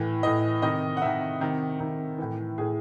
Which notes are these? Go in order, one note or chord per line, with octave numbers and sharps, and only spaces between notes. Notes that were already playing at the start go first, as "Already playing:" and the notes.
Already playing: A2 E3
A2 E3 D#5
C3 D#3 D#5
F#5
C3 D#3 E5
C3 D#3
C3 D#3
A2 E3
A2 E3 G#4